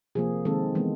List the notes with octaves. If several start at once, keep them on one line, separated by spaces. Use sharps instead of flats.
C3 F3 A#3 G#4
D#3 G#3 C4 A4
E3 G#3 B3